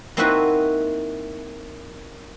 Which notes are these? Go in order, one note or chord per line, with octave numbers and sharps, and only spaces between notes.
A#3 C4 D#4 E4 F#4 B4